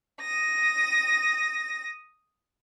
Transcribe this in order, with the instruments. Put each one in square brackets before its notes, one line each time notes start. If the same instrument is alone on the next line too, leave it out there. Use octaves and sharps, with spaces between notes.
[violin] D#6 A#6